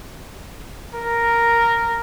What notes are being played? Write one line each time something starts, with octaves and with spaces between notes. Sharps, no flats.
A#4